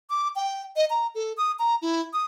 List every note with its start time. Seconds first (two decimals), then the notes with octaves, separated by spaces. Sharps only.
0.10 D6
0.36 G5
0.76 D#5
0.90 A#5
1.15 A4
1.37 D#6
1.59 A#5
1.82 E4
2.13 D#6